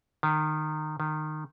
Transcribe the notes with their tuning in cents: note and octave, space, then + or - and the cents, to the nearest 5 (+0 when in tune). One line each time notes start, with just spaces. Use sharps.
D#3 -20
D#3 -20